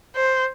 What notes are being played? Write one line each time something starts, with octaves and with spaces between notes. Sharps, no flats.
C5